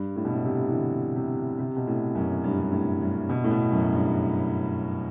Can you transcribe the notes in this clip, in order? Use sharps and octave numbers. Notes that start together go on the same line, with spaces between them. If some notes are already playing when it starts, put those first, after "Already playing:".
Already playing: G2
A2
B2
A2
C3
E3
D3
C3
C3
B2
A2
F#2
G2
G2
A2
G2
B2
A2
B2
F#2
G2